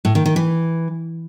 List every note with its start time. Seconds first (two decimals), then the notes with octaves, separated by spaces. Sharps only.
0.05 A2
0.15 D#3
0.26 D#3
0.36 E3